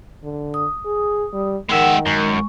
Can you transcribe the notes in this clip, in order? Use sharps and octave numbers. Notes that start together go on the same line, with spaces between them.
D3
D#6
G#4
G3
D#3 G#3 A#4 E5 F#5 G5
F#2 G#3 C#6